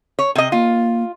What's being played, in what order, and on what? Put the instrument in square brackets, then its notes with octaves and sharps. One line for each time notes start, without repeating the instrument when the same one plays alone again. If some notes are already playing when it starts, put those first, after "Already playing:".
[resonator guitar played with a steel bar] C#5
C3 D#5
[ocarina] A#3 [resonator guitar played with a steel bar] F4